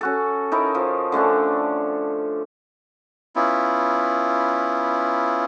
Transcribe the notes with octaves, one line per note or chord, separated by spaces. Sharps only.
C#4 F#4 A4
D#4 E4 A#4 C#5
F3
D3 A3 C#4 D4
B3 C#4 E4 F4